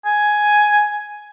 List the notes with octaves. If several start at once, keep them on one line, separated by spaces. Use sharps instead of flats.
G#5